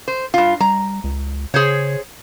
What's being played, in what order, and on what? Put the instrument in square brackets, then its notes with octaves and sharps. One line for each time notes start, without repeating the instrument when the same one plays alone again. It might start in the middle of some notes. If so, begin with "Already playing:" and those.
[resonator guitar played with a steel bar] C5
G2 F4
[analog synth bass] G3 [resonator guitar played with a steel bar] A#5
[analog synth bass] C#2
[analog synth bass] C#3 [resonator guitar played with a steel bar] G#4 C5 C#5